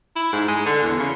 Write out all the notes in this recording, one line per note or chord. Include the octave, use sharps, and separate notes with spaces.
E4
G#2
G#3
D3
E2
C#3